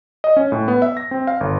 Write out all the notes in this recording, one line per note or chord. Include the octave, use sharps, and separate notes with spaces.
D#5
C#4
A2
B3
E5
A#6
C4
F5
G1